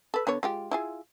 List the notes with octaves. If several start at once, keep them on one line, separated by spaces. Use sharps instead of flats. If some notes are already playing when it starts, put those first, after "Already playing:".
A4 B4
D3 B3 C#5
G#3 F4 G4
E4 F4 G#4